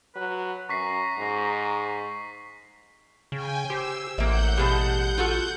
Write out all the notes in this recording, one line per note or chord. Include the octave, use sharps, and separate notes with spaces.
F#3 B4
F#2 A#5 C#6 B6 C7
G#2
C#3 G5 G#5
G4 C5 E6
A1 A#3 E5 F#5 G6
B2 G3 G#3 A5
F4 F#4 A4